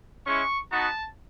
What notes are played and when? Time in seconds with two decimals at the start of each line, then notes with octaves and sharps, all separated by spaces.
0.25 G#3 C#4 E4 C#6
0.71 B3 D#4 F#4 A5